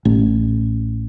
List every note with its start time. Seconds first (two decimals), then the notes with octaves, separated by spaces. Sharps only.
0.05 A1